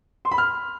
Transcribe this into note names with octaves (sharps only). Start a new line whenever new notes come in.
C6
B5
F6